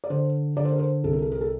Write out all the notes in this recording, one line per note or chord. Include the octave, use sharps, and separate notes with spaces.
D5
D3 C5
D3 D5
C5
A#4
C5
C2 A4
A#4
A4
A#4
A4